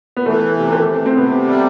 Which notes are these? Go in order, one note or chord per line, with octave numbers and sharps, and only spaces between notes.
B3
E3 A3
C3
A3
C3
C4
C3 B3
G3